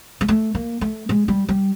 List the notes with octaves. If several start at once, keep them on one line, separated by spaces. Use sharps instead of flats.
G#3
A3
A#3
A3
G#3
G3
G3